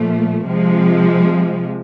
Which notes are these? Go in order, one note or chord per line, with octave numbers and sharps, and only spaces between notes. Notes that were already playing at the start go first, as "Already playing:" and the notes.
Already playing: A#2 F3 A3
C3 F3 G#3